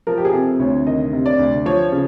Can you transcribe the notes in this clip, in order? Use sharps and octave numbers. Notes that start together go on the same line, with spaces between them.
F3 A#4
G4
G#4
C3 A4
D2 C#5
D#3 D#5
C3
D5
D2
F3 C#5
C#3